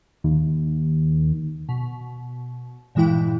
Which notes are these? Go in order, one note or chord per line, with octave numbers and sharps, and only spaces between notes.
D#2
B2
G2 A#2 E3 G#3 E4 G5